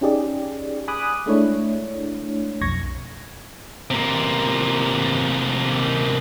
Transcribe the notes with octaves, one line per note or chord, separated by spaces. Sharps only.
C#4 D#4 G4 G#4 D5
G#5 B5 D6 D#6 F#6
G#3 A3 D4 E4 C#5
B1 F2 C#6 G#6 A#6
C3 A#3